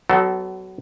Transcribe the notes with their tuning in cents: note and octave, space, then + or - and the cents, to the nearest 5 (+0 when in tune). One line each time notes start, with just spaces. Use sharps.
F#3 +25 B3 +35 A4 +0